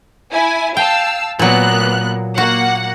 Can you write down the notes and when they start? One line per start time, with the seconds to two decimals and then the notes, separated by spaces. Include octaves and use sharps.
0.32 E4 G#5
0.77 F5 G5 A5 E6
1.39 A#2 F#3 A#3 B3 F#6
2.38 A#3 F#4 F#5